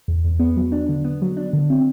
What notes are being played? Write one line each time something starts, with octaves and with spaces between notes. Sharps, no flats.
E2
E2
B3
F#3
D4
D3
B3
F#3
D4
D3
C4